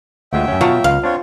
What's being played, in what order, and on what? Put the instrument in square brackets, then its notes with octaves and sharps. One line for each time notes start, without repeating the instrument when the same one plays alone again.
[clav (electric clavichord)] D2 G#3 F4 [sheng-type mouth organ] E5 G5 [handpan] F#5
[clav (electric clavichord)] F#2 C#4
[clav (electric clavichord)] B2 F5 A5 [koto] F#3 [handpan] F4
[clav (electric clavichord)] C#2 [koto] F5
[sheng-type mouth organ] C4 F4 C#5 [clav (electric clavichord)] D4